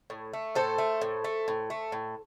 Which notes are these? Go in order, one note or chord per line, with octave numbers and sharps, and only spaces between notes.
A2
A3
A2 A4 C5
A3
A2
A3
A2
A3
A2